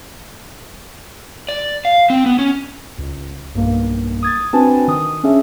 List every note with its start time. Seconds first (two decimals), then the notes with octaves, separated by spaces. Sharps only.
1.49 D5
1.85 F5
2.10 C4
2.26 B3
2.39 C#4
2.98 C#2
3.55 B1 G2 A#3
4.23 D#6 G#6 A6
4.53 C4 D4 F#4 B4 G#5 A5
4.88 D#3 D#6
5.24 C#4 D4 G#4 E5